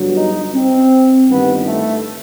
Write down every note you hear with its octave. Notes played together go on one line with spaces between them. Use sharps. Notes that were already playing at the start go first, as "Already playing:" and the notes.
Already playing: G1 G2 F#3
D#4
C4
G1 G2 D#3 B3
A3